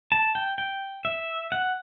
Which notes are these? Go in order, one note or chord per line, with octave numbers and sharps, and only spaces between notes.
A5
G5
G5
E5
F#5